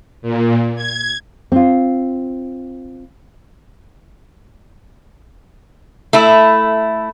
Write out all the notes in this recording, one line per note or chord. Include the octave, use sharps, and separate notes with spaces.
A#2
G#6
C4 F4
A3 E4